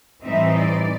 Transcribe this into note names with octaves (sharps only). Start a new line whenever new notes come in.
A2 E3 G3 C4 D#4 E5
D5